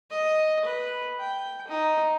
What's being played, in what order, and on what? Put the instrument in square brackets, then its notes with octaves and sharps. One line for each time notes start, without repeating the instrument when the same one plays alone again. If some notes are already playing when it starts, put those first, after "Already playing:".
[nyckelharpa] D#5
B4
G5
D#4